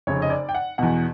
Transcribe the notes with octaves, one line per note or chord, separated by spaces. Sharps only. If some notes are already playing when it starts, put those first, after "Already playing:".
F1 F2 C#3 C#5
D#5
D5
G5
F#5
E2 B2 F#5